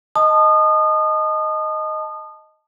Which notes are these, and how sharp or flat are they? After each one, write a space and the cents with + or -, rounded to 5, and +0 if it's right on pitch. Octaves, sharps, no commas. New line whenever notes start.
D#5 +0 A5 -5 D#6 -30